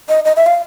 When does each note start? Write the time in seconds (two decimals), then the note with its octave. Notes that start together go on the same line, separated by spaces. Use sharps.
0.09 D#5
0.25 D#5
0.36 E5
0.47 F5